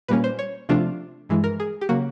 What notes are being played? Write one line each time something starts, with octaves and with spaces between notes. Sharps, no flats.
A#2 G3 A#3 C#4 B4
C5
C#5
C3 F3 A3 D4 F4
G2 E3 G#3
A#4
G#4
G4
C#3 F#3 A#3 F#4